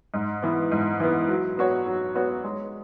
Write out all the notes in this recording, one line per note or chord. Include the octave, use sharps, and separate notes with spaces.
G#2
E3 B3
G#2
E3 B3
F#3
B3 F#4 C#5
F#3
B3 F#4 C#5
G#3